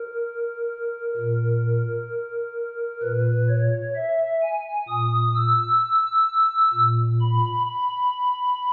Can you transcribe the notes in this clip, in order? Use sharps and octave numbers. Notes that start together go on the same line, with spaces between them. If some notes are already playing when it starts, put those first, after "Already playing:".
Already playing: A#4
A#2 A#4
A#2 B4
C#5
E5
G#5
A#2 D#6
E6
A#2
B5
B5